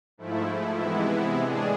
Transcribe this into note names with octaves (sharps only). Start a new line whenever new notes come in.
G#2 F3 A3 E4
C3 E3 G#3 B3 E4
A2 G#3 D4 G#4